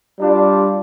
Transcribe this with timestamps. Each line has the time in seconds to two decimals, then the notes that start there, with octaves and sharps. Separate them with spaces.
0.19 G3 D4 F4